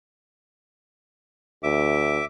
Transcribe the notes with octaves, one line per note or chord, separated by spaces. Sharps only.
D2 E5 D6